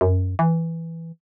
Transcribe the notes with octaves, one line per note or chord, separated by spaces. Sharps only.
F#2
E3